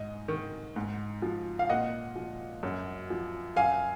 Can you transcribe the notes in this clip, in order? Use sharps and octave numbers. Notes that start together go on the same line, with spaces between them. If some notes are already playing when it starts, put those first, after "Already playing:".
Already playing: G#2 D#5
D#3
G#2
F3
F5
A#2 D#5 F#5
F3
F#2
F3
F#2 F5 G#5